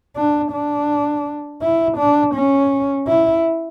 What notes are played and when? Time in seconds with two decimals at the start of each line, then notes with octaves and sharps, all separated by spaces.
0.16 D4
0.52 D4
1.62 E4
1.97 D4
2.34 C#4
3.07 E4